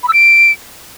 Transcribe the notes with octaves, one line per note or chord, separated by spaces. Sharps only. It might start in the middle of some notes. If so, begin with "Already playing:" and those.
B5
E6
D7